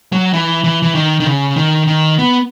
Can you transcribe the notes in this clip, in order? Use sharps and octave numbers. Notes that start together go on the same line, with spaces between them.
F#3
E3
E3
E3
D#3
D#3
C#3
D#3
D#3
B3